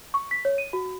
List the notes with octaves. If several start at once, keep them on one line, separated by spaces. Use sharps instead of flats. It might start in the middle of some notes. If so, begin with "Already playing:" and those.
C#6
B6
C#5
D#7
F#4